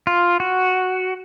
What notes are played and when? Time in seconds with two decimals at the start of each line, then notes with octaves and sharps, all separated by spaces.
0.07 F4
0.40 F#4